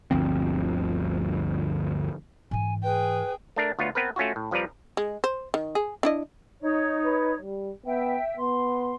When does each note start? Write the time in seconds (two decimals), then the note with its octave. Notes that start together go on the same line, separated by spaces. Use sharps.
0.11 G1 D2 F3 C4
2.51 G#2 E3 G#5
2.83 G#4 B4 G5
3.56 A3 D4 A#4
3.79 D2 B3 F4 B4 C#5
3.95 B3 C4 A#4 B4
4.16 A3 C#4 F4 F#4
4.36 A2
4.51 F2 F3 G3 B4 D5 A#5
4.97 G#3
5.24 C5
5.54 D#3
5.75 G#4
6.03 D4 E4 D#5
6.61 D#4 C#5
7.04 B4
7.42 G3
7.86 B3 E5 G5
8.37 B3 C6